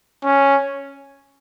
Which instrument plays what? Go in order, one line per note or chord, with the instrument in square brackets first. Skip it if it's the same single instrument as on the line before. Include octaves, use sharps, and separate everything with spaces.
[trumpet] C#4